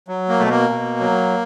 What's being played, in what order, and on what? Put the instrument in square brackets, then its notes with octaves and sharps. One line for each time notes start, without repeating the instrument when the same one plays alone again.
[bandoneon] F#3
A#3
B2 A3
A#3
B2
F#3